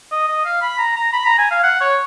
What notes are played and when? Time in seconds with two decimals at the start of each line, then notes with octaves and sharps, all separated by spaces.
0.11 D#5
0.28 D#5
0.45 F5
0.62 B5
0.78 A#5
0.96 A#5
1.13 B5
1.26 A#5
1.38 G#5
1.51 F5
1.63 F#5
1.80 C#5